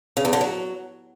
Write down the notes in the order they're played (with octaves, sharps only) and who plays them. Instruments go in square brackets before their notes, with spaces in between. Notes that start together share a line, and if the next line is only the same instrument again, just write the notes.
[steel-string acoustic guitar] C#3
E2
D3
F#3